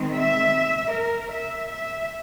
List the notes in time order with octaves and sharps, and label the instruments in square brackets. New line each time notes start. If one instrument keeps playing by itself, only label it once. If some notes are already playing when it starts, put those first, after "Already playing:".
Already playing: [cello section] D#3 G#3 C4
E5
A#4
E5
E5